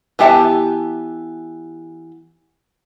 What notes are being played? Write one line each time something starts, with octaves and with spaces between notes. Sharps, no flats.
E3 B3 G4 E5 A5